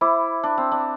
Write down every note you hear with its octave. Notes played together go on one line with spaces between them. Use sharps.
E4 C5 E5 B5 D6
D4
C4
D4